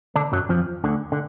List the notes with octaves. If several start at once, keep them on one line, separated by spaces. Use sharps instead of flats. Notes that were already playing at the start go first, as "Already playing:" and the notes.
D3 D4
F#2 F#3
F2 F3
D2 D3
D3